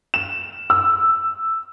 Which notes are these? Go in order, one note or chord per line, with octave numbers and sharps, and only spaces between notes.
E7
E6